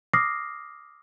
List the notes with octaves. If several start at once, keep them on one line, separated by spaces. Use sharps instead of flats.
D6 D#6 F6 A#6 C7